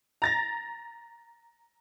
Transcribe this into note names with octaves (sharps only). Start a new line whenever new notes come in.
A#5 A6 A#6